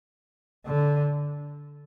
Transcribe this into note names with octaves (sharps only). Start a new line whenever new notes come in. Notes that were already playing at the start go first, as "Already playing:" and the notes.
D3